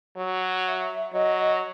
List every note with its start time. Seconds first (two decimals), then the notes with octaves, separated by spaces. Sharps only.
0.17 F#3
0.66 E5
1.13 F#3 D#5